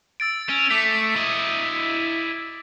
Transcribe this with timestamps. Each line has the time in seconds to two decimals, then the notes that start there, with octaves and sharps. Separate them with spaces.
0.20 E6 A6 D7
0.49 C#4
0.70 A3 D6 B6
1.16 E4 D#5